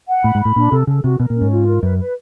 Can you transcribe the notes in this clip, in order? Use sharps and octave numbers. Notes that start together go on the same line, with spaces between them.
F#5
A2 B5
G#2
A2 B5
A#2 D4
C3 A4
C#3 A4
C3 F#4
B2 A#4
A#2
C#4
G#2
F4
A#4
F#2 B4
B4